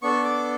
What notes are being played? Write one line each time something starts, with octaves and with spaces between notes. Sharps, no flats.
B3 D4 A4 C#6
D6